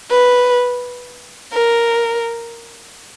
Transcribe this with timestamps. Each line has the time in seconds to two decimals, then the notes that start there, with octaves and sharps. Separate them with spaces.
0.11 B4
1.53 A#4